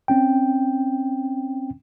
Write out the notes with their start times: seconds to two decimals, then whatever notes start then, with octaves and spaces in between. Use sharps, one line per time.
0.08 C4 C#4 G5